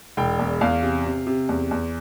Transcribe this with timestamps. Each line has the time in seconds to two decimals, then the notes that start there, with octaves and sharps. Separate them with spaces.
0.17 E1 G5
0.39 E2
0.61 E2 F5
0.83 C3
1.06 C3
1.27 C3
1.49 E2
1.71 E2